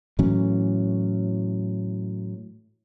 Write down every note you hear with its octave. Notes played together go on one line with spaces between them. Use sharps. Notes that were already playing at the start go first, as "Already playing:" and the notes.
A2 E3 F#3 C#4